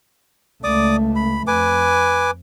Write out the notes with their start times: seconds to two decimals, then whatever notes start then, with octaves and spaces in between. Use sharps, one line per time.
0.64 C#2 A3 D5 D6 D#6
1.16 B5
1.47 F2 B4 G#5 D6